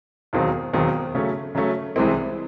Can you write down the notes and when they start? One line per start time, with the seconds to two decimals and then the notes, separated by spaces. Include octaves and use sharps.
0.33 E1 D#2 D#3 F#3 C4
0.73 E1 D#2 D#3 F#3 C4
1.14 C#3 F#3 A3 C#4
1.55 C#3 F#3 A3 C#4
1.96 C2 C3 E3 G#3 C4